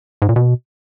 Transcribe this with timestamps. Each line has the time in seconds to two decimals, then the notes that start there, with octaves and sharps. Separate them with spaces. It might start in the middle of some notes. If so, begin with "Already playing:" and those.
0.22 G#2
0.29 A#2
0.36 B2